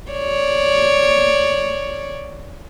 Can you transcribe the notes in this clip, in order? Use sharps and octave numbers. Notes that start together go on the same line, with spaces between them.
C#5 D5